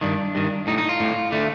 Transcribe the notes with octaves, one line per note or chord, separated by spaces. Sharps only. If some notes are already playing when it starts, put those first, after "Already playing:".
G2 D#3 D4
G2 D#3
A2 D#4
D#4
F4
A2
D3 A3